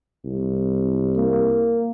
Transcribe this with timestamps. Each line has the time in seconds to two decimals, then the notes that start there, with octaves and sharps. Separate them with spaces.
0.25 C2
1.17 A#3